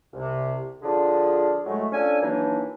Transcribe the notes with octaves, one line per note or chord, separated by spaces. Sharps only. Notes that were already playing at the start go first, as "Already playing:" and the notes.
C2 C3
D3 F3 D4 F4 G#4
A2 F#3 G#3 A3
C#4 D4 F4 A4 G#5
D#3 E3 F#3 A#3 D4 D#4